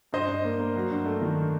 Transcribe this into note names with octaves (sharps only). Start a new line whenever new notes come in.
G2 C5 D#5
G2
A#3
A#3
F#3
G2
A3
D#3